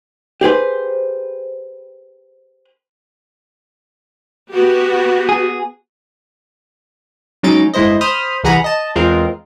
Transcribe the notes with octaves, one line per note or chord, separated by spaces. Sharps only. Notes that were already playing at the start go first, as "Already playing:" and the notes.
G4 G#4 B4 C5
B3 F#4 G4
G#4
F#3 G#3 C#4 D#4 A6 D7
G1 G#3 E4 C5 D#5
C5 B5 D#6 F6
C2 E3 G#4 F#5 A#5 B5
D#5 A5
E2 G#3 C4 F4 A#4